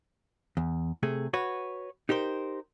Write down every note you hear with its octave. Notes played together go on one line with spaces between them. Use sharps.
E2
C3 A3 G#4
F#4 B4 C#5
D#4 G4 A#4 C5